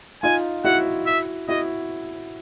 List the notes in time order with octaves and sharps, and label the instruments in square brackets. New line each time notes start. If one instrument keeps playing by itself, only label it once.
[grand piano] D#4 F4 [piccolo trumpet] G#5
[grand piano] E4 F#4 [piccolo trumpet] F#5
[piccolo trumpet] E5
[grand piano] E4 F#4 [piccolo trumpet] D#5